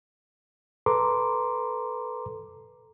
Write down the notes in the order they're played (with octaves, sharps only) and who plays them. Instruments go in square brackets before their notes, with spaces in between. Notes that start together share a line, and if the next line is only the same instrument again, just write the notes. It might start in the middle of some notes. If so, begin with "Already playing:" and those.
[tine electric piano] A4 B4 A#5 C6 D6